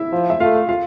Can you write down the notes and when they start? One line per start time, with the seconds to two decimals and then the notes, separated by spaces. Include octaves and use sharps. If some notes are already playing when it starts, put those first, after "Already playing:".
Already playing: E4 E5
0.12 F3
0.30 E5
0.40 A3 F4 F5
0.69 F4 F5